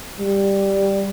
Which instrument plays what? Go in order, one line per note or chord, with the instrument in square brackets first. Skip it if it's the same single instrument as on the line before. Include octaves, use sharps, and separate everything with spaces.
[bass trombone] G3